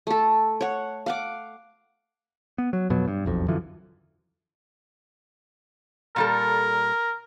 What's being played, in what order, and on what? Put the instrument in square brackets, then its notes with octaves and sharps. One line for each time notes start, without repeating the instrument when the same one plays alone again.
[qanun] A3 A4
C#5 F#5
F5 F#5 D6
[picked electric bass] B3
F#3
F2 B2 F#3
G2
E1 B1 F2
F#2 D3 E3 F3
[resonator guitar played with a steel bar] A#2 G3 A4 [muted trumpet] A#4